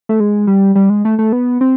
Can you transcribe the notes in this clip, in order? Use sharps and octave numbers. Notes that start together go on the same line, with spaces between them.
A3
G#3
G3
G3
G#3
A3
A3
B3
C4